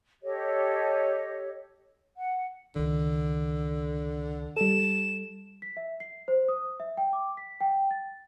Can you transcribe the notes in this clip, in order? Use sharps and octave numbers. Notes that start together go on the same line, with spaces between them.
G4 A4 C#5 D#5
F#5
C#2 D3 D#3
G3 A4 E7
B6
E5
C7
C5
D#6
E5
G5
D6
B6
G5
A6